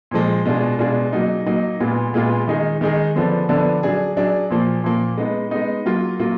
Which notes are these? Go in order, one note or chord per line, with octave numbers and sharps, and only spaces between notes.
A#2 F3 G#3
B2 G#3 D4 F4 G#4
B2 G#3 D4 F4 G#4
F#3 A#3 D#4
F#3 A#3 D#4
A#2 G#3 B3 F4 G#4
A#2 G#3 B3 F4 G#4
D#3 G#3 D#4 G#4
D#3 G#3 D#4 G#4
D3 F3 B3 D4
D3 F3 B3 D4
F#3 D4 G#4
F#3 D4 G#4
A#2 F3 A#3
A#2 F3 A#3
G#3 B3 D#4
G#3 B3 D#4
F#3 A#3 F4
F#3 A#3 F4